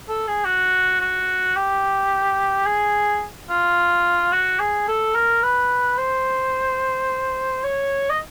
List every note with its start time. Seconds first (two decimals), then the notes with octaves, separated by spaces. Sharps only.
0.09 A4
0.28 G#4
0.45 F#4
1.00 F#4
1.56 G4
2.66 G#4
3.50 F4
4.32 F#4
4.60 G#4
4.88 A4
5.15 A#4
5.43 B4
5.98 C5
7.64 C#5
8.10 D#5